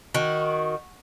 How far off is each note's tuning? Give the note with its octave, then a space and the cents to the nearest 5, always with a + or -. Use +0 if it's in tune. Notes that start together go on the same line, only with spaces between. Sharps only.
D#3 +0 F#4 -10